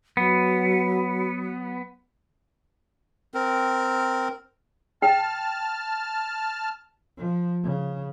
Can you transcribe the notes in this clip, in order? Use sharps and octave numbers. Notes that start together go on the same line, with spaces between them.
F#3 B3
C4 A#4
G5 A5 F6
F3
C#3